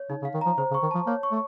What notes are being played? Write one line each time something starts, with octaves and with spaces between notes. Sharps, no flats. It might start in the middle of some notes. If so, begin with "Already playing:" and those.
Already playing: C#5
C#3 D#4
C#3
F5
D#3
F3 A#5
C#3 C5
C#3
C#6
D#3
F3 A5
A#3 C#5
C#6
A3